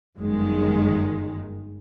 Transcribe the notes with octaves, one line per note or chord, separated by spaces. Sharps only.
G1 F#2 D#3 G#3